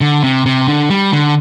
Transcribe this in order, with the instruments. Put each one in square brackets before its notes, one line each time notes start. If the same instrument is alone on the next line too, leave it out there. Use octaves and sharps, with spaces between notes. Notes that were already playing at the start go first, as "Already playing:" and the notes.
[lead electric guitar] D3
C3
C3
D3
G3
D3